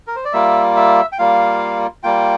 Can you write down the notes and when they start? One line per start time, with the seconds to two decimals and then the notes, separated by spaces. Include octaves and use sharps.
0.07 A#4
0.16 C5
0.25 D5
0.33 G3 A#3 F4 E5
0.76 E5
1.12 G5
1.19 G3 A#3 F4 F5
2.04 G3 A#3 F4 G5